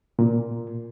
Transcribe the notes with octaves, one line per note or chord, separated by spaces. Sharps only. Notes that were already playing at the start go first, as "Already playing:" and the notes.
A#2